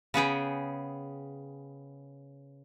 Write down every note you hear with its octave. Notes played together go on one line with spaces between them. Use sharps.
C#3 B3 G#4 G5